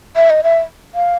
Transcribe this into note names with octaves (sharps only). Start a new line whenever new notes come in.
E5
D#5
E5
F5